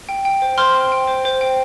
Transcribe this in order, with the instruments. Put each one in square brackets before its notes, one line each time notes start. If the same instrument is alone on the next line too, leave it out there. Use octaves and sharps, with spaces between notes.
[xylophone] G5
G5
C5
C5 C6 F6
G5
G5
C5
C5
G5